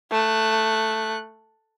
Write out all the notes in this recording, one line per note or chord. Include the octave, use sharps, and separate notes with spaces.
A3 F#6